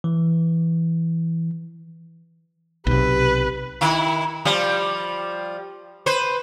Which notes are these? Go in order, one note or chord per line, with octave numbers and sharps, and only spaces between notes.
E3
B1 C3 G4 B4
D#3 E4
F3 G3
B4 C5